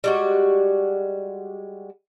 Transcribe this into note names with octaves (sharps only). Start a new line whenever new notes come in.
G3 G#3 F#4